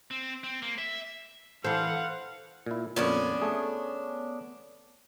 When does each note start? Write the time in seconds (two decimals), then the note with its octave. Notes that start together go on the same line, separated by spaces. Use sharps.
0.11 C4
0.44 C4
0.62 A#3
0.78 E5
1.64 E3 A4 C5 F5 F#5
2.66 A#2 E4
2.96 F2 A#2 B3 C#4 D4
3.42 A3 G#4